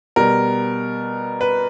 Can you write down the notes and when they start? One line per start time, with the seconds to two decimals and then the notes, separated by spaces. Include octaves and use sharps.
0.16 B2 G3 A#4
1.41 B4